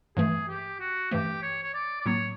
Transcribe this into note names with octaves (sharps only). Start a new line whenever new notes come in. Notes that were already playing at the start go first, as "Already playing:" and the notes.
G2 E3 A3 G#4
G4
F#4
G2 E3 A3 G4
C#5
C#5
D5
D5
A2 F#3 A#3 C#5